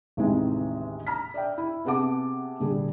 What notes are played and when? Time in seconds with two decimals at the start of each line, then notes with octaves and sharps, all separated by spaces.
0.17 A1 D#2 C3 D#3 E3 G#3
1.07 A#5 F6 B6
1.34 D5 E5 G5
1.58 E4
1.85 C3 B3 G#4 F#5 A5 D6
2.60 A#2 D3 G3 G#4